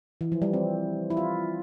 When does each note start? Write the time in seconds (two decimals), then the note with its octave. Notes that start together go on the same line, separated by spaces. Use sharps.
0.21 E3
0.32 F3
0.42 G3
0.53 C4
1.10 E4
1.17 F4